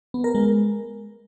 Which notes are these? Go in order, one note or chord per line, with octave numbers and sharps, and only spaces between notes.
B3
A#4
G#3